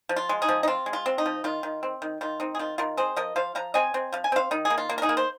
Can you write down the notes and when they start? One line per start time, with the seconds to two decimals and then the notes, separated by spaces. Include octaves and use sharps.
0.09 F3
0.16 F4
0.29 G#3
0.42 D#4 G#4
0.49 F3
0.63 D#4
0.68 C4 F4
0.86 G#3
0.93 F4
1.06 C4
1.18 D#4
1.26 F3
1.44 D#3 F4
1.63 D#3
1.83 C4
2.02 D#3
2.21 D#3 F4
2.40 C4 D#4
2.55 G#4
2.59 D#3 F4
2.78 D#3 F4 A#4
2.97 C4 G#4 C5
3.16 F3 A#4 D#5
3.36 F3 C5 F5
3.55 F3 F5 A#5
3.74 C4 D#5 G#5
3.94 C4
4.12 F3 F5
4.24 G#5
4.32 C4 C5 F5
4.51 D#3 D#4
4.65 G#4
4.70 A#3
4.78 F4
4.89 A#3
4.98 A#4
5.02 D#4 G#4
5.09 A#3
5.17 C5